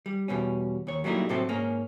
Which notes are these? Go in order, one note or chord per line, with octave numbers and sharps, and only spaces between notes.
G3
E2 B2 G3 C#4
D#2 C#5
F#3 G3 A3 A#3 D#4 E4
A2 C3 F#3 C4 A4
G#2 A#3 C#4